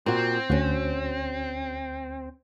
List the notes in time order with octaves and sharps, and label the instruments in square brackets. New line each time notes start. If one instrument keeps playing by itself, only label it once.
[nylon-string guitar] A#2 F#4 [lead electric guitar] C4
[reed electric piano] D2 [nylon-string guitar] C#4 F#4